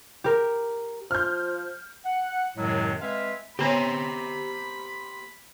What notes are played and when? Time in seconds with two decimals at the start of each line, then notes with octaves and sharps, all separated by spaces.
0.24 G4 A#4
1.11 F3 F6 G6
2.06 F#5
2.57 F#2 A2 C3 D#3 F#3 G#3
3.01 G#3 C4 B4 E5 F5
3.59 D3 B3 G4 C5 C#5 A#5 B5